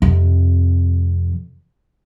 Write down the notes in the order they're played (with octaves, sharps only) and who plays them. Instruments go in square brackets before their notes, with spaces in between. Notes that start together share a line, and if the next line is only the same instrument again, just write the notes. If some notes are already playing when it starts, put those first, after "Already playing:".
[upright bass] F2 C3